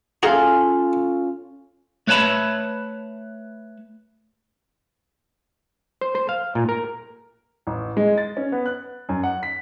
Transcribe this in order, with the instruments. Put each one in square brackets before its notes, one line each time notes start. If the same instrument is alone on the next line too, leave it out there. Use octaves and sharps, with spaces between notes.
[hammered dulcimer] C#4 F4 [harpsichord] F#4 G#4 A#5 [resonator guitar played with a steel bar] A4 F5
[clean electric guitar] A3 B4 C#5 F5 A5 B5
[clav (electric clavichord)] C5
C5
F5
A#2
A#4
[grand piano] A1
G#3
A6
C#4
B3
F#6
F#2
F#5
B6